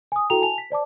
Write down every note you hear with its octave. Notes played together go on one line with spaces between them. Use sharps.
G#5 D#6
E4 F#4 A4 G5 A#5 F7
G#5 A5 F7
B6
C5 D5 A5 D6